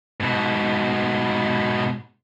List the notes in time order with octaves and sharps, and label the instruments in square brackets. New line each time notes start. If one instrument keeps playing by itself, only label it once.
[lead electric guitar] G#2 B2